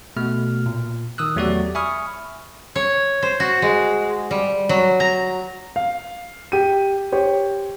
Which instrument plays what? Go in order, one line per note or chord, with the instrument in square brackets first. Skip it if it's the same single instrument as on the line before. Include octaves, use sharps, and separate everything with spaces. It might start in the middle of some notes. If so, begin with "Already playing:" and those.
[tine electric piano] B2 A3 F6
A#2
D#3 D#6 E6 F#6
E2 F#3 A3 F#4 G4 D5
E5 G#5 B5 C#6 D#6 F6
[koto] C#5
C5
F#4
G#3
G3
F#3
A#5
[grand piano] F5
G4 D#7
G4 C5 C#5